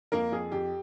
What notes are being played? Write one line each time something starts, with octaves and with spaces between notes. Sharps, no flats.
F2 A#3 A#4
F2 G#4
F2 G4